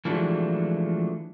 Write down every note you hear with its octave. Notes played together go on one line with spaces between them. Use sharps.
E3 F3 G#3 A3 D4 F#4